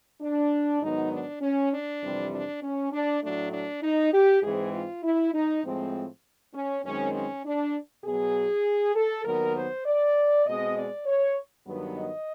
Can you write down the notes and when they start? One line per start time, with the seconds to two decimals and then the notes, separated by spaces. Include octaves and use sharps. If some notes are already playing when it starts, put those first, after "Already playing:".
0.21 D4
0.82 G#2 D#3 F#3 B3 D#4
1.12 D4
1.41 C#4
1.72 D4
2.02 F2 C3 E3 G3 C4
2.33 D4
2.62 C#4
2.92 D4
3.22 A2 F#3 A3 D4
3.52 D4
3.83 D#4
4.13 G4
4.43 G#2 E3 G#3 C4 G#4
4.73 F4
5.03 E4
5.34 D#4
5.64 A2 F3 G#3 C4
6.54 C#4
6.84 F#2 D#3 G#3 C4 C#4
7.14 C#4
7.45 D4
8.05 B2 F#3 B3 G#4
8.95 A4
9.25 D#2 D#3 F#3 B3 A#4
9.55 C5
9.86 D5
10.45 B2 G#3 C4 D#5
10.76 D5
11.06 C#5
11.66 G2 D#3 F#3 B3
11.96 D#5